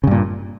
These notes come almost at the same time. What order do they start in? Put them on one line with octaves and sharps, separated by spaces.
C#3 G2 A#2